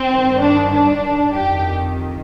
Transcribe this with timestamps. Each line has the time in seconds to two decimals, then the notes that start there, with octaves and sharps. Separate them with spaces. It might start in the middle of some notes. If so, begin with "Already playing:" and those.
Already playing: C4
0.08 G2 D#3
0.41 D4
0.72 D4
1.35 F2 D#3 G4